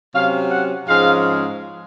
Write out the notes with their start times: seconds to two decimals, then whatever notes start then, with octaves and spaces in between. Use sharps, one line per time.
0.14 C3 F#3 C#4 F5
0.50 F#5
0.88 G#2 F3 G#3 C#4 F5